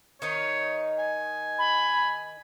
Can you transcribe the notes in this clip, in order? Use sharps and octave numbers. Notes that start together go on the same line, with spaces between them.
D#3 D#4 C#5
G#5
B5